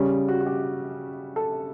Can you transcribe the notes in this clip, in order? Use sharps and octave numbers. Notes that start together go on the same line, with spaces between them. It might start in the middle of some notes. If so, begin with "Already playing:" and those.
Already playing: C#3 G3 C#4
F#4
F#4
G4
A4